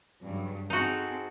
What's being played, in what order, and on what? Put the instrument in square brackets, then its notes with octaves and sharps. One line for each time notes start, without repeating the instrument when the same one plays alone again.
[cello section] G2 C#3 F#3
[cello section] C4 G#4 A4 [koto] D#4 F#4